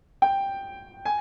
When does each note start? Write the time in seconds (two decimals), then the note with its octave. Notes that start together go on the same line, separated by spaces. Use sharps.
0.22 G5
1.05 G#5